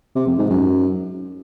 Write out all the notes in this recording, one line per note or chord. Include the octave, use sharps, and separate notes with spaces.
C3
F2
G#2
F#2